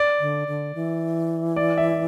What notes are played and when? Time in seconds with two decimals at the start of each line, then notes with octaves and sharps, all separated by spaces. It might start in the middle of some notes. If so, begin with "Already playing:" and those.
Already playing: D5
0.20 D3
0.48 D3
0.75 E3
1.56 D5
1.77 E5